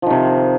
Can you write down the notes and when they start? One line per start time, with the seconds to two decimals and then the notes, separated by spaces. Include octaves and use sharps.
0.02 F3
0.06 D#3
0.10 C3